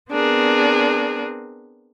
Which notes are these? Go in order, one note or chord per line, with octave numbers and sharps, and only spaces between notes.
B3 C4 D4 G#4 A#4